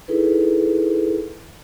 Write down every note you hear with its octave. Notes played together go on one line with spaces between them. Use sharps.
D#4 E4 G#4 A4 B4